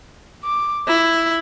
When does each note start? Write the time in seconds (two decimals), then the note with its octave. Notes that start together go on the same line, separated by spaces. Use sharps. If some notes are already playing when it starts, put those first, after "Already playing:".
0.43 D6
0.88 E4